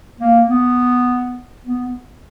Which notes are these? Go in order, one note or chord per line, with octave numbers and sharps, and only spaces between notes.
A#3
B3
B3